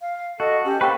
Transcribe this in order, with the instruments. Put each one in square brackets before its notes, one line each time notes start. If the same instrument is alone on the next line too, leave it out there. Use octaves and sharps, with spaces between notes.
[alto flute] F5
[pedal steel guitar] F#4 [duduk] A4 [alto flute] D#5
[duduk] C#4 [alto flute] G4
[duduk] A#3 [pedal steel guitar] A4 B4 [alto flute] C5 [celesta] G5 C#6